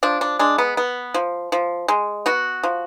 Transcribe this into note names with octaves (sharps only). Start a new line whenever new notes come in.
F3 D4
D4
G#3 D4
B3
B3
F3
F3
G#3
B3 F#4
F3